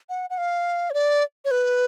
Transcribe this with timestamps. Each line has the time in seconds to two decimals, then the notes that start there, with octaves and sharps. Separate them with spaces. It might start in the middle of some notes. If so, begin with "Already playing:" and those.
0.09 F#5
0.30 F#5
0.38 F5
0.90 C#5
0.94 D5
1.45 C#5
1.51 B4